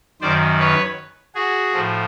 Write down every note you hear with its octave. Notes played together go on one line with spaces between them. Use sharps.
F#2 D#3 C5 D5
B4 C#5
F#4 G#4
A2 F3